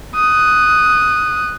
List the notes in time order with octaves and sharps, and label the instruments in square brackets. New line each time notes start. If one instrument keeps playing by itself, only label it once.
[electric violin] D#6 F#6